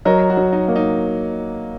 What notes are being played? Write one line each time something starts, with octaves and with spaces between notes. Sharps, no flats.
F#3 A#4 D#5
F#4
F#3
D#4
A#3
D#4